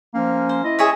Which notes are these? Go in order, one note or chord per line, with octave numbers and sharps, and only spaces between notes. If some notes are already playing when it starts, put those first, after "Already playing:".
F3 A#3 C#4
C5
E4 D#5
G#4 C#5 E5